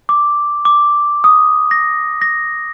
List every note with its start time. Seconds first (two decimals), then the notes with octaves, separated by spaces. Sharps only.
0.09 D6
0.65 D6
1.24 D#6
1.71 A#6
2.22 A#6